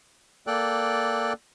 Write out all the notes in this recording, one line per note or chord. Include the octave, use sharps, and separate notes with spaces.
A#3 A4 D5 G5 F#6